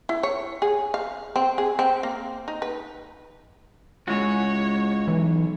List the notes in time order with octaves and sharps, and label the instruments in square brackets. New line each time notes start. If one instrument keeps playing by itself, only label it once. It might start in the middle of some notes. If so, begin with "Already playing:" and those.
[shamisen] E4
C#5
G#4
F5
C4
G#4
C4
A#3
D#4
B4
[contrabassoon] C#2 [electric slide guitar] G#3 E4 F#4 [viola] C#5
[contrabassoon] B1 [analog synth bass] E3